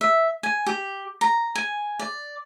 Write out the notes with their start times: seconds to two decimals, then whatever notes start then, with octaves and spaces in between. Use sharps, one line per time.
0.01 E5
0.43 G#5
0.67 G4
1.21 A#5
1.55 G#5
1.99 D5